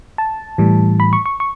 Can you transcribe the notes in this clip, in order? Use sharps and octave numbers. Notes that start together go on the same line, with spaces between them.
A5
A2 E3 G3
B5
C#6
C#6
C#6